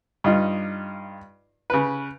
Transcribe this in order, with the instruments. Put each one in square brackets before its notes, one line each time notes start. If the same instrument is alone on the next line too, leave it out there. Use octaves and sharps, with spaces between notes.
[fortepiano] G2 D#4 F4
C#3 B4